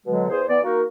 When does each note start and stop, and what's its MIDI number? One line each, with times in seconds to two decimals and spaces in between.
0.06 0.29 47
0.06 0.29 50
0.06 0.29 54
0.06 0.29 56
0.29 0.42 40
0.29 0.42 68
0.29 0.42 72
0.48 0.59 52
0.48 0.59 59
0.48 0.59 74
0.63 0.82 58
0.63 0.82 63
0.63 0.82 66
0.63 0.82 70